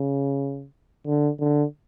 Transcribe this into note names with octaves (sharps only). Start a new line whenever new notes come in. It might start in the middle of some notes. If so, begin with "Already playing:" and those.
Already playing: C#3
D3
D3